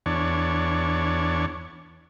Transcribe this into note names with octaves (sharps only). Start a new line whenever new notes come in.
E2 D4 C#5